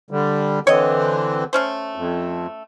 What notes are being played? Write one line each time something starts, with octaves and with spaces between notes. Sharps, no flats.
D3 G3
D3 E3 C4 C#5 D#5
A3 C#4 C5
F2